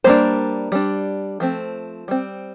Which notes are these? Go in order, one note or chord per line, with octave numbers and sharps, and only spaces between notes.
G3 A#3 D4 C5
G3 D4
F3 A3 C4
G3 C4